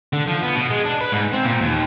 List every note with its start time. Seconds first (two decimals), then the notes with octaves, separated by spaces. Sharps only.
0.13 D3
0.28 F3
0.43 B3
0.55 B2
0.71 G#3
0.85 D4
1.01 B4
1.12 G#2
1.33 C4
1.45 A#2
1.61 D#2